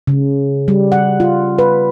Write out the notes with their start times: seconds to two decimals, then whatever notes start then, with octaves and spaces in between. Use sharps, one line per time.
0.07 C#3
0.68 G3
0.92 F#5
1.20 F4
1.59 B4